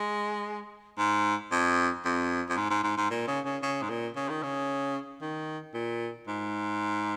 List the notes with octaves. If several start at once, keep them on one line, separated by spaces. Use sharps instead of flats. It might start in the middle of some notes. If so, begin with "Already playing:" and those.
Already playing: G#3
G#2
F2
F2
F2
G#2
G#2
G#2
G#2
A#2
C#3
C#3
C#3
G#2
A#2
C#3
D#3
C#3
D#3
A#2
G#2